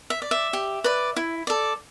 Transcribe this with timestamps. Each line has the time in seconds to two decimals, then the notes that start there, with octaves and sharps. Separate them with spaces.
0.10 E5
0.22 D5
0.31 E5
0.53 G4
0.84 B4 D5
1.16 E4
1.47 A4 D5